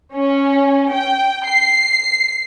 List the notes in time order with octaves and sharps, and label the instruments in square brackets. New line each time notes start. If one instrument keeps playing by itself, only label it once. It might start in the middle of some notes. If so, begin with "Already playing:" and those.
[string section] C#4
G5
C7